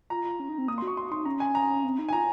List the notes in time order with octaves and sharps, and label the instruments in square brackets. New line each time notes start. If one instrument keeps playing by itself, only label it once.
[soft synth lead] F4 [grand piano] A#5
[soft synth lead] F4
C#4
D#4
C4
[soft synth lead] A#3 [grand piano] D#6
[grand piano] C6
[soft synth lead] F#4
[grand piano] C#6
[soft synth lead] F#4 [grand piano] C6
[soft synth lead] D#4 [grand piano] C6
[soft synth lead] C#4 [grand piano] A#5
[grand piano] G#5
A#5
[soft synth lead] C4
D#4
[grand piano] G#5
[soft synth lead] F4 [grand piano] A#5